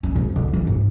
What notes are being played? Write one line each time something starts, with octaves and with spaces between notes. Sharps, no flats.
C#4
G#2
D3
E3
G#2